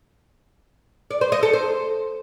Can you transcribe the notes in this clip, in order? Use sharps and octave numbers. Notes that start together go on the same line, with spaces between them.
D5
C5
D#5
A4
C5